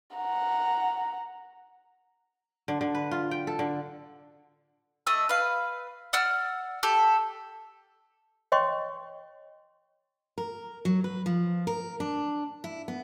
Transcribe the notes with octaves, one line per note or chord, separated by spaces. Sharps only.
F#5 A#5
D3
D3
B4
F4
G5
A4
D3
A3 D#5 E6
B4 F5
D5 F#5 E6 F6
G4 A4
C#5 D#5 G5 C6 C#6
A#4
F#3
B4
F3
A#4
D4
E4
B3